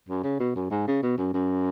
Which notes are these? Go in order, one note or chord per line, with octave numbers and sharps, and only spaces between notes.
F#2
C#3
B2
F#2
G#2
C#3
B2
F#2
F#2